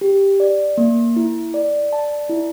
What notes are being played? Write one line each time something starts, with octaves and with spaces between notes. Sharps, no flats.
G4
D5
A#3
E4
D5
A5
E4